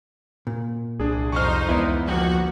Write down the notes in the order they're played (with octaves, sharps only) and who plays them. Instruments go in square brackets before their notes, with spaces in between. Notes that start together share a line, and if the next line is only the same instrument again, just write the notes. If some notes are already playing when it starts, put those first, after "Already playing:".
[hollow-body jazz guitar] A#2
[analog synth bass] C2 [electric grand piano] D4 G#4
[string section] F2 D#4 C5 [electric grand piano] C#6 F6
[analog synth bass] C#2 [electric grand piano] E3 B3 [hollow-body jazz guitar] E4 D5
[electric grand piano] G1 [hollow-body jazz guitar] F3 G5 [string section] A#3 F#4